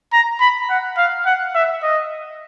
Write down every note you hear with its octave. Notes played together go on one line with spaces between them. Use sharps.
A#5
B5
F#5
F5
F#5
E5
D#5